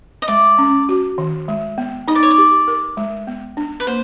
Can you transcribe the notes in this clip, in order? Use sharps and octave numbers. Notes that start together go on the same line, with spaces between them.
D#5
G#3 D5
C#4
F#4
D#3
G#3
B3
D#4 D#5
D5
C#5
D5
G4
A#4
G#3
B3
D4
B4
A#3 C5